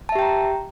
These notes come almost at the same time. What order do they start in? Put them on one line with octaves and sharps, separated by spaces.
A5 E5 G4 G5 A#5